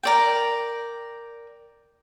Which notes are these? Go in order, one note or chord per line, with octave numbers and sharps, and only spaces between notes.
A#4 D5 G5